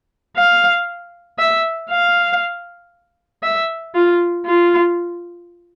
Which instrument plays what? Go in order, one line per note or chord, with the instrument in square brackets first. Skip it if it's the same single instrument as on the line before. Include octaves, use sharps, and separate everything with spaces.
[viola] F5
E5
F5
E5
F4
F4